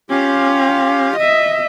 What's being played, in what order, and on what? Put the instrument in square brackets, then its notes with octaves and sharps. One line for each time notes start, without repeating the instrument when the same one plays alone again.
[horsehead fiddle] C#4 [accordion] F4 G4 F5
[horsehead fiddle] D#5 E5